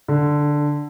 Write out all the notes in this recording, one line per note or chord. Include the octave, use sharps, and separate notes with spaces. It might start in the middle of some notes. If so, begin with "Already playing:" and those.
D3